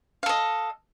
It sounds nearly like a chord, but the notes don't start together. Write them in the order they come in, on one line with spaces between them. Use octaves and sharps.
F5 A4 D#5